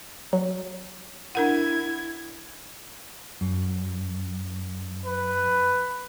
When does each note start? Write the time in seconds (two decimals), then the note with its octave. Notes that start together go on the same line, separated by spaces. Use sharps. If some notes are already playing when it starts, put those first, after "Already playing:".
0.33 F#3
1.35 D4 E4 A#4 F#5 G#6
3.41 F#2
5.05 B4